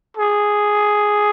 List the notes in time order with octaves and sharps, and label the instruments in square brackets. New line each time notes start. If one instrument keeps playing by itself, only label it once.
[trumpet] G#4